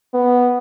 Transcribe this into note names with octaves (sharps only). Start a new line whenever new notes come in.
B3